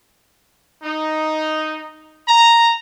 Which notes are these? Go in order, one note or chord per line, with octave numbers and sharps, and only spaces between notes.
D#4
A#5